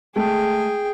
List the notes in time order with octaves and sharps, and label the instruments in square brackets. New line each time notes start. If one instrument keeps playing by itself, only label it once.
[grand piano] G#3 A3 [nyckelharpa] G#4 G5